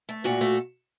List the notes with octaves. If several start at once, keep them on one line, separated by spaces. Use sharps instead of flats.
A3
A#2 F#4
A3